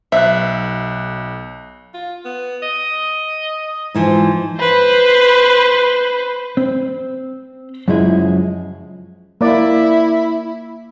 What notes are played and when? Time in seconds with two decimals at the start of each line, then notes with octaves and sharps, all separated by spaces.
0.12 B1 E5 F#6
1.94 F4
2.25 B3
2.63 D#5
3.95 G#2 E3 F3
4.58 B4 C5
6.57 C4
7.88 F#2 C#3 F3 F#3 G#3 E4
9.41 A#3 E4 D5